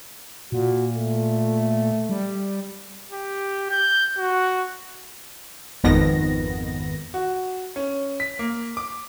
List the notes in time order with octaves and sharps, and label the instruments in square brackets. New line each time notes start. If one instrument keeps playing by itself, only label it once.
[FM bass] A#2 [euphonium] F#4
[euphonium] A3
[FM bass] G3
[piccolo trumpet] G4
G6
F#4
[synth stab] G#1 F2 D#3 B3 A#6
[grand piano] F#4
C#4
B6
A#3
D6